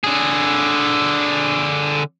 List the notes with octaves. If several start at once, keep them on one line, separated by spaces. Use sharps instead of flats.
D3 G#4